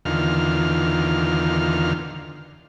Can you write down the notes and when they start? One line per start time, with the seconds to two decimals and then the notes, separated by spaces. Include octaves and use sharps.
0.05 E2 D3 D#3 F4 F6